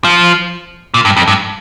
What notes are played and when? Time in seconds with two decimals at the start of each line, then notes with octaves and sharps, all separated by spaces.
0.04 F3
0.94 A#2
1.05 G2
1.17 F2
1.28 G2